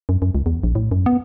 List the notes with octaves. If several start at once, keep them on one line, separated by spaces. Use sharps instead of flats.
F#2
F#2
C#2
E2
A#1
A2
F#2
B3